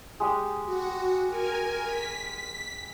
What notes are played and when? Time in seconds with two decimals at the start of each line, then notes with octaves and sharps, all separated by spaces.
0.20 G#3 G4 D#6
0.65 F#4
1.28 A#4 G#5
1.86 B6